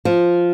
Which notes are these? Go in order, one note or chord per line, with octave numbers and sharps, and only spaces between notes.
F3